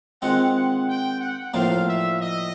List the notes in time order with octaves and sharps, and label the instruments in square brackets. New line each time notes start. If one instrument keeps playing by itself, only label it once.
[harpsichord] D#3 G#3 C4 F4 [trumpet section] F#5
[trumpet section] F#5
G5
F#5
[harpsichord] A2 F3 A#3 D4 [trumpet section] F5
[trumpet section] E5
D#5